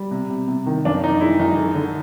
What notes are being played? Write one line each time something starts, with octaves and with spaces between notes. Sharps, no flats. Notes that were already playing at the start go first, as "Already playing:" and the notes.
Already playing: G3
C3
C3
C3
D#3
F#2 D4
F#2 D#4
G#3 E4
F#2 D#4
D3
D3